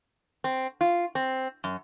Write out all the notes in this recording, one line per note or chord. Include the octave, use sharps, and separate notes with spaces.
C4
F4
C4
F#2